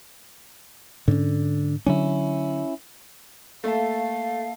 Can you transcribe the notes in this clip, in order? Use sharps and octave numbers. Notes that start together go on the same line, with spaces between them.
G#2 D3 C#4
D3 F#3 C#4 D4 E4
A3 A#3 E5 F5 A5